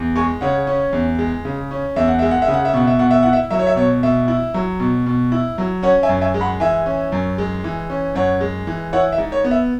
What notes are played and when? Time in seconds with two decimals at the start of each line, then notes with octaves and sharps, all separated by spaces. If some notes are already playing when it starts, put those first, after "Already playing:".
Already playing: E2
0.16 G#3 G#5 C#6
0.41 C#3 C#5 F#5
0.67 C#4
0.93 E2
1.19 G#3
1.45 C#3
1.71 C#4
1.96 E2 E5
2.08 F#5
2.19 G#3 E5
2.31 F#5
2.42 E5
2.48 C#3
2.54 F#5
2.65 E5
2.74 B2 F#5
2.87 E5
2.99 B2 F#5
3.11 E5
3.23 E4 F#5
3.33 E5
3.50 F#3 E5
3.59 C#5
3.67 E5
3.76 B2 C#5
4.03 B2 E5
4.28 E4
4.54 F#3
4.80 B2
5.06 B2
5.32 E4
5.58 F#3
5.83 C#4 C#5 F#5
6.03 E5 G#5
6.09 F#2
6.21 E5 G#5
6.34 G#3
6.41 F#5 B5
6.60 E3 E5 G#5
6.86 C#4
7.12 F#2
7.38 G#3
7.64 E3
7.90 C#4
8.15 F#2 C#5 F#5
8.41 G#3
8.67 E3
8.93 E4 C#5 F#5
9.12 E5
9.18 G#2
9.32 C#5
9.44 B3
9.51 E5